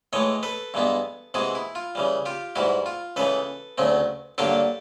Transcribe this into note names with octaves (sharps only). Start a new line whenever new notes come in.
A2 E3 G#3 C#5 D#5
A4 B4
G2 E3 G#3 B3
C3 E3 G#3 F#4 G#4
E4
F4
C#3 E3 G3
F4 G4
G#2 E3 G3 E4 F#4
F4
C#2 C#3 E3 A4 B4
D2 C#3 F#3 A3 C4
G2 D3 F#3 A#3 D4 G4 A4